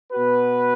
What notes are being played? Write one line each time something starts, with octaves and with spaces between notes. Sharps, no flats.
B2 B3 F#4 B4